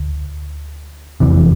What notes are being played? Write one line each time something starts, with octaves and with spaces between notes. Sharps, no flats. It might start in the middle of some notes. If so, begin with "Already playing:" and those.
Already playing: D2
F1 E2 C3 E3